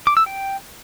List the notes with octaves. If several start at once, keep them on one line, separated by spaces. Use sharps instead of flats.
D6
E6
G5